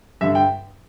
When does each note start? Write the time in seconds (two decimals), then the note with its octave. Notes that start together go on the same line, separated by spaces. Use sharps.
0.21 G2 D3 E5
0.35 G5